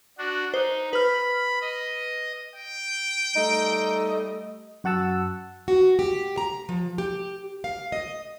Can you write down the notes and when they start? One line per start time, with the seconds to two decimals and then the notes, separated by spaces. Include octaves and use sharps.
0.18 D4 F#4
0.54 D#4 C5
0.93 B4 B5 F6
1.62 D#5
2.56 G5
3.36 G3 A3 D#4 D#5
4.84 F#2 F#4 F#5 A5 E6
5.68 F#4
5.99 G4
6.38 A#5
6.69 F3
6.98 G4
7.64 F5
7.92 D#5